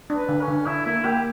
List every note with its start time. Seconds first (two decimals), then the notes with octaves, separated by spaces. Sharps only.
0.10 D4
0.16 B4
0.29 D3
0.41 C#4
0.48 D3
0.66 D3 E4
0.86 A#3 E4
1.05 A#3 G4